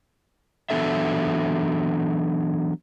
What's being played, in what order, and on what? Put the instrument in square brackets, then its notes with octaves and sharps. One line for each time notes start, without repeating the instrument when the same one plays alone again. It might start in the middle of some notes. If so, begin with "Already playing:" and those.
[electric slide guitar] E3 F#3 B3 D4 A4 E5